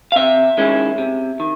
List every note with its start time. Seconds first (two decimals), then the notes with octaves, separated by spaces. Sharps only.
0.12 F5
0.16 C3 E5
0.57 D#3 G#3 C#4 E4
0.98 C3
1.40 D#3